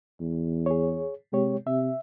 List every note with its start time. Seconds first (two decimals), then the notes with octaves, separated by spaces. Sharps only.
0.20 E2
0.66 G#4 C#5
1.33 C3 G#3 G4 C#5
1.67 C3 E5